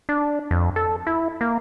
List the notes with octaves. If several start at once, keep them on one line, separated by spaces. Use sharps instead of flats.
D4
F2
A4
E4
A#3